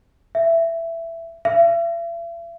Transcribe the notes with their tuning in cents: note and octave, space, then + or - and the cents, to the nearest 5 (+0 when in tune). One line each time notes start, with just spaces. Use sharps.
E5 +10
E5 +45